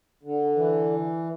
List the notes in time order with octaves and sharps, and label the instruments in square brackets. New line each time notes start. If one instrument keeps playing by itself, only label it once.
[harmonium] D3
E3